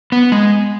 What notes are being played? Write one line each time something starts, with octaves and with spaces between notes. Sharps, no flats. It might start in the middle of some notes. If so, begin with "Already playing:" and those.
B3
G#3